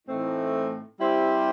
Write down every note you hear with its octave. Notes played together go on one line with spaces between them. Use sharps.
A2 E3 A3 C4 D#4
G3 C4 E4 G4 C5